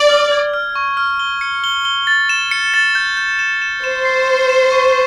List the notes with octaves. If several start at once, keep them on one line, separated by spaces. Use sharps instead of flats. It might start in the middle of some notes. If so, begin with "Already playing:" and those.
Already playing: D5
F6
G#6
F6
C#6
F6
G7
C#7
G7
G7
A6
E7
C#7
A6
G6
G6
E7
E7
C5 E7
C7
E7
E7
C#6